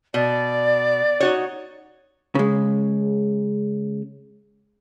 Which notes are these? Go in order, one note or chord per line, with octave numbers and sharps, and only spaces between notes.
B2 D5
D#4 F#4 C#5
C#3 G#3